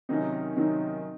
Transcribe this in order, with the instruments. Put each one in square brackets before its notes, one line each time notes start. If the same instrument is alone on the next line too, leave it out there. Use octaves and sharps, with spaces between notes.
[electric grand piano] C3 D#3 F#3 C#4 [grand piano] C4 D#4
[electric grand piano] C3 D#3 F#3 C#4 [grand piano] C4 D#4